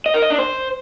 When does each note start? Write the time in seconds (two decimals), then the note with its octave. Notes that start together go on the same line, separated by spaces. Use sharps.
0.06 D#5
0.14 A#4
0.22 D#5
0.30 D4
0.38 C5